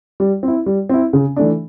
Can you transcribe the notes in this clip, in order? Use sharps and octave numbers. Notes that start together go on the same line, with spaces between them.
G3
C4 E4
G3
C4 E4
C#3
E3 A3 D4